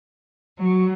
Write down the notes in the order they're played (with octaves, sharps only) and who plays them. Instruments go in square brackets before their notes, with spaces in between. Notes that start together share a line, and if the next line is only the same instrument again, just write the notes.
[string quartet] F#3